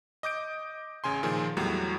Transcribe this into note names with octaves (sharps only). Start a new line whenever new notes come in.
D#5 D6 G6 D7
A1 C#3 G#5 C6
A#2 D#3 F3 G#4
E2 A2 F#3 G3